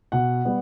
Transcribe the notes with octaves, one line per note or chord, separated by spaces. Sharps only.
B2 F#5
G3 B3